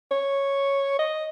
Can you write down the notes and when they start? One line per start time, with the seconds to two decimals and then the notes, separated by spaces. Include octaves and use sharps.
0.11 C#5
0.99 D#5